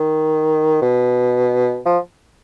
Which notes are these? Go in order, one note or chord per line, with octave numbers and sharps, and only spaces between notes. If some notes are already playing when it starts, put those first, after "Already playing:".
Already playing: D#3
B2
F3